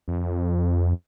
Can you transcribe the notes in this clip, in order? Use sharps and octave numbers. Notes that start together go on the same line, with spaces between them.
F2